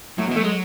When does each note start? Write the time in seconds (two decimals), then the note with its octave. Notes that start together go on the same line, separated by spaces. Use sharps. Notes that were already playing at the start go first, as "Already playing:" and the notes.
0.18 A2 F#3
0.27 B2
0.31 E3
0.36 A3
0.41 F#3 G#3